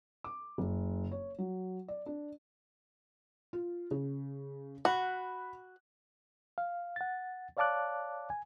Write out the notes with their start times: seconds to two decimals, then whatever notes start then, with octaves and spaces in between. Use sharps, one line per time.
0.24 D6
0.58 F#1
1.11 C#5
1.38 F#3
1.88 D5
2.06 D4
3.53 F4
3.91 C#3
4.85 F#4 B5 F#6
6.58 F5
6.96 F#5 A6
7.57 C#5 D5 F5 A5 D6 F#6
8.30 G#5